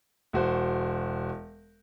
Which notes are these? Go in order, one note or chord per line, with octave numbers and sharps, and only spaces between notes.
E1 F#4 C5